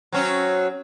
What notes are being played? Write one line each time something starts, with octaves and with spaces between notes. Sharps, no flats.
F#3 C4 C#4